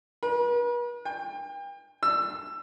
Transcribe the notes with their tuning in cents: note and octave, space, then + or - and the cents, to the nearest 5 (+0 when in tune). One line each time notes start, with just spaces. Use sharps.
B4 -40
G5 +35
E6 +20